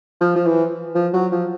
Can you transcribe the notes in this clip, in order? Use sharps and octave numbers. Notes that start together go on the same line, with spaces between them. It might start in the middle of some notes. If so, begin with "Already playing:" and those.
F3
F3
E3
F3
F#3
F3